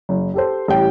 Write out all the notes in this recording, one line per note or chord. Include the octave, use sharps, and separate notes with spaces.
F#1
G4 A4 C5
A1 G3 G5